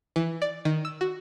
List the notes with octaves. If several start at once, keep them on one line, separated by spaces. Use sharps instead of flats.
E3
D5
D#3
E6
F#4